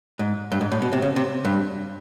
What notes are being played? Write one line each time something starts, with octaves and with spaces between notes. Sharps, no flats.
G#2
G2
G#2
A2
B2
C3
C#3
C3
G2